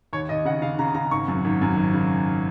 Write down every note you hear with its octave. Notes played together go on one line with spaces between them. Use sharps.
D#2 C#5
D#2 D#5
C#3 F#5
C#3 F5
C#3 A#5
C#3 A#5
G#1 C#6
F#2
G#1
F#2
G#1
C#3